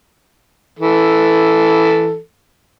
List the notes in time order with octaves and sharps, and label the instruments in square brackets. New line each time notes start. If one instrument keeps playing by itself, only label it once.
[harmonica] E3 A4